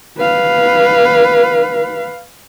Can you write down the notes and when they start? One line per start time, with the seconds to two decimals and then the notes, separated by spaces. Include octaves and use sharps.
0.18 B4 F5